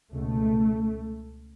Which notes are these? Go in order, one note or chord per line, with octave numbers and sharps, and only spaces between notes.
C#2 B2 A3